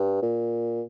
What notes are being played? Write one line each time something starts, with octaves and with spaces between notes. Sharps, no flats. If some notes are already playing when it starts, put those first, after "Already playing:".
Already playing: G2
A#2